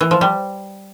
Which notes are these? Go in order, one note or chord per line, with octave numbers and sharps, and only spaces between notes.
E3
F3
G3